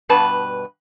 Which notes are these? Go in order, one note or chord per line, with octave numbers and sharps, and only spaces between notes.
G2 B2 B4 A5